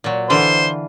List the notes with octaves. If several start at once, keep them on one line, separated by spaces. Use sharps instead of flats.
A#2 F#3
D3 E3 C5 F5